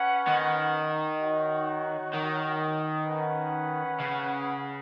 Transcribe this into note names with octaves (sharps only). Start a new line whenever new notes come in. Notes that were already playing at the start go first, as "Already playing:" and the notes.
Already playing: C#4 B4 F#5
D#3
D#4 F#4 C#5 F#5
D#3
C#4 B4 F#5
C#3